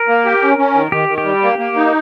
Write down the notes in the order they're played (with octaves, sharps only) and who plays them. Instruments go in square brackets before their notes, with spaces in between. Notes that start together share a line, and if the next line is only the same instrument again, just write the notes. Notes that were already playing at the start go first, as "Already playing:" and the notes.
Already playing: [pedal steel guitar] A#4
[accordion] A#3
G4
C#4
C#4
D#3
[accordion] D#3 [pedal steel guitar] G4
[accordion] D#3
[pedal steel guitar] G4
[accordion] G3
A#3
A#3
D#4